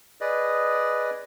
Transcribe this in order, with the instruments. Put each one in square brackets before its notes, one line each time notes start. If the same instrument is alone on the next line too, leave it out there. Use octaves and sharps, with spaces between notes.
[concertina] G#4 B4 D5 D#5